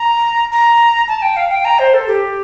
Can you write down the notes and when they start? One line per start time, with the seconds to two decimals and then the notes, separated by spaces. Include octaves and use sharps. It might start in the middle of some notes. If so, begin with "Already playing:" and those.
Already playing: A#5
0.52 A#5
1.08 A5
1.22 G5
1.36 F5
1.51 G5
1.65 A#5
1.79 C5
1.94 A4
2.08 G4